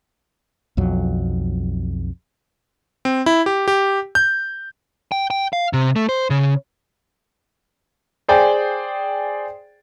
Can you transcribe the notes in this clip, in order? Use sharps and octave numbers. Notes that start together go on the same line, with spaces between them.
B1 F2 F#3
C4
E4
G4
G4
G6
G5
G5
F5
C3
A3
C5
C#3
G#4 C5 D5 G5 G#5